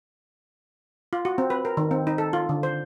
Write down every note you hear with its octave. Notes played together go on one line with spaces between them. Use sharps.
F4
F#4
C4
B4
A#4
D#3
C4
D#4
A4
F4
D3
C5